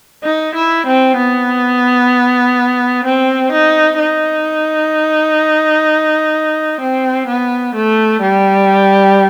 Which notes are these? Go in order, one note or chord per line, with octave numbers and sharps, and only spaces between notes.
D#4
E4
C4
B3
C4
D#4
D#4
C4
B3
A3
G3